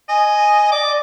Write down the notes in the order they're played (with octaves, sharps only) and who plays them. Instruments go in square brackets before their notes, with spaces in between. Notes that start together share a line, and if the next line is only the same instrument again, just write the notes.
[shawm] D#5 [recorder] G#5
[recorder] D5 [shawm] D6